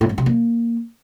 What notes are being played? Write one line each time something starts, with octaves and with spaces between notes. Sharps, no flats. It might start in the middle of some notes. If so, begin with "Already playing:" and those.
A2
G#2
C3
A#3